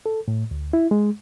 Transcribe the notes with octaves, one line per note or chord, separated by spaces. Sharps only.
A4
A2
D2
E4
G#3